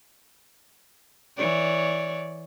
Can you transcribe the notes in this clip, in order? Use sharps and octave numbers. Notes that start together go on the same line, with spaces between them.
E3 C#5 D5